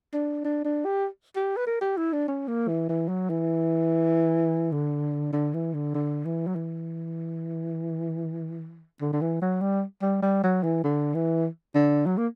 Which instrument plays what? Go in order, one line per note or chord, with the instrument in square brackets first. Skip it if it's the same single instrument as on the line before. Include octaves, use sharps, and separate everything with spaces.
[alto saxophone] D4
D4
D4
G4
G4
B4
A#4
G4
E4
D4
C#4
A#3
E3
E3
F#3
E3
D3
D3
E3
D3
D3
E3
F#3
E3
D3
D3
E3
F#3
G3
G3
G3
F#3
E3
D3
E3
D3
F#3
A#3